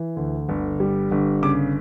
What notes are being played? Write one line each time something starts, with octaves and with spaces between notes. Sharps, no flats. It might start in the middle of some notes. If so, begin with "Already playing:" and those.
Already playing: E3
D2
G1
G3
G1
C#3 D6